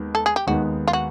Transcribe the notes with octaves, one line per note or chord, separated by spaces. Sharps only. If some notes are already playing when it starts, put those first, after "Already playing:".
Already playing: D#2 D#3 G#3 B3
A4
G#4
G4
D#2 D#3 G#3 B3 F#4
F4
F#4